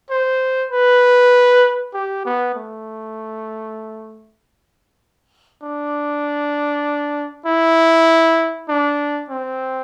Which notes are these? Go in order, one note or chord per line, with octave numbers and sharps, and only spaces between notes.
C5
B4
G4
B3
A3
D4
E4
D4
C4